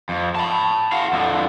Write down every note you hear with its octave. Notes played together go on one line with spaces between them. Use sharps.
F2
A5 B5
F#4 F5
F2 D3